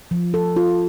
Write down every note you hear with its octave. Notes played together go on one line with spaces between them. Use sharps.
F3
A4
F4